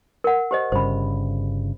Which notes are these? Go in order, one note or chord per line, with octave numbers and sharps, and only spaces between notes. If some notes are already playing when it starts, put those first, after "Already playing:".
A#4 F#5
G4 C5 D#5
G1 G2 C#3 C5 B5